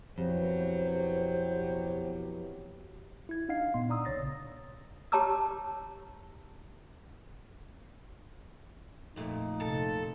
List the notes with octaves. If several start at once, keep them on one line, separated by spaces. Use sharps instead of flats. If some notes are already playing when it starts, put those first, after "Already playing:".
F2 B2 E3 F#3 G4 C5
E4 G#6
D4 D#4 D#5 F5 F#5 C7
A#2 B3 C6
D5 A#5 D#6 E6
A#1 C#3 C#5 A6 A#6
G4 C#5 A5 A#5 D6 E6
F2 A#2 A3 D#4
C3 A4